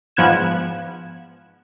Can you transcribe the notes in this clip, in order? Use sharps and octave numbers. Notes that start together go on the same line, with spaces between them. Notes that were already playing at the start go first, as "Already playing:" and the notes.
G#2 F3 B3 F#6 G#6 E7